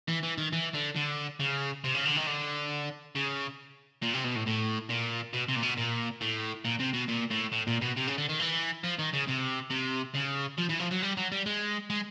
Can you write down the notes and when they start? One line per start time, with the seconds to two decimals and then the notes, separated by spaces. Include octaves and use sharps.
0.09 E3
0.23 E3
0.38 D#3
0.52 E3
0.74 D3
0.96 D3
1.40 C#3
1.84 C3
1.95 C#3
2.05 D3
2.16 D#3
2.27 D3
3.15 C#3
4.03 A#2
4.14 C3
4.24 B2
4.35 A2
4.46 A2
4.90 A#2
5.33 B2
5.49 C3
5.56 A#2
5.63 B2
5.78 A#2
6.21 A2
6.65 A#2
6.80 C3
6.94 B2
7.09 A#2
7.31 A2
7.52 A2
7.67 A#2
7.81 B2
7.96 C3
8.07 C#3
8.18 D3
8.29 D#3
8.39 E3
8.84 F3
8.99 D#3
9.13 C#3
9.27 C3
9.71 C3
10.15 C#3
10.58 F3
10.70 E3
10.80 F3
10.92 F#3
11.02 G3
11.17 F#3
11.32 G3
11.46 G#3
11.90 G#3